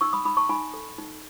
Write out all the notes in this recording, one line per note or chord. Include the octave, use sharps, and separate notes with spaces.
D#4 C#6 E6
B5 D#6
D#4 B5 D#6
A5 C#6
D#4 G#5 B5
A4
D#4